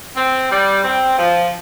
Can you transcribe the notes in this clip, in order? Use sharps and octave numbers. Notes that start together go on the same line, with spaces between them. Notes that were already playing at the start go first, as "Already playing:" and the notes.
C4
G3
C4
F3